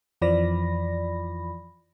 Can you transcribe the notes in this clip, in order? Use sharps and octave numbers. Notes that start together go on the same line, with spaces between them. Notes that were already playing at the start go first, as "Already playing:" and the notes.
F2 E3 F3 D5 B5 A#6